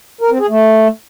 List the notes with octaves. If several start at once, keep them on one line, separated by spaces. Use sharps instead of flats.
A#4
C4
G#4
A3